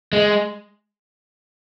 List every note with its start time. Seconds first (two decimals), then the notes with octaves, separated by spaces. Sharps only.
0.13 G#3